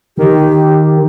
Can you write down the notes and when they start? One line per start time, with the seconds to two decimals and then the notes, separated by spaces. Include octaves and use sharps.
0.18 D#3 G4